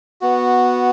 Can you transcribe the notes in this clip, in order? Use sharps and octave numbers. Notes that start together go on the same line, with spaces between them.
B3 F#4